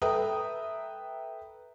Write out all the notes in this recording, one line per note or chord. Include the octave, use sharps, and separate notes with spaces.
A4 B4 E5 G5 A#5 D#6